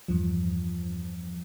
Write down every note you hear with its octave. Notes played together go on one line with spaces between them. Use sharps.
E2 G2 F3